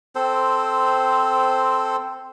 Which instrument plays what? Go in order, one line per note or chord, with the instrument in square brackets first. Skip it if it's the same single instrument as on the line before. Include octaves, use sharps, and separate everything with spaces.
[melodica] C4 A4 C5